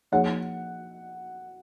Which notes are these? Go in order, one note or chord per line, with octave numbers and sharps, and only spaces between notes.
F3 A#3 D#4 G#4 C#5 F#5